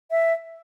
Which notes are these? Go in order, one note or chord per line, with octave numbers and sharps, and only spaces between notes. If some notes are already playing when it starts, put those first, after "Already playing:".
E5